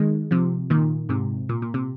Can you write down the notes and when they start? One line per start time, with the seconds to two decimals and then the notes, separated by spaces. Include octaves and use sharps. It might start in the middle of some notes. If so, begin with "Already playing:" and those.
Already playing: D#3 G#3
0.31 C3 F3
0.70 A#2 D#3
1.09 G#2 C3
1.49 A#2
1.62 A#2
1.74 C3